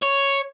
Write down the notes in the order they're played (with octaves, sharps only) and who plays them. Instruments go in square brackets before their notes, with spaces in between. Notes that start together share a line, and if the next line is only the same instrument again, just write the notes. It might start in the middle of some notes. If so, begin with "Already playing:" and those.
[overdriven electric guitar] C#5